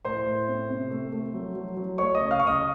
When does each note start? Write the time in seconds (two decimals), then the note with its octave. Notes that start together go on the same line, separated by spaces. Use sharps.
0.05 A2 C5 C6
0.26 A2
0.48 C4
0.70 C3
0.90 A3
1.13 A3
1.34 F#3
1.56 F#3
1.77 F#3
1.98 A3 C#5 C#6
2.15 D#5 D#6
2.20 C#3
2.31 F5 F6
2.40 C#3 C#6
2.47 D#5 D#6